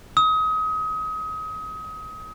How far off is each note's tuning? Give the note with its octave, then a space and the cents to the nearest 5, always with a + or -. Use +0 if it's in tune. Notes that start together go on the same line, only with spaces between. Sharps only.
D#6 +30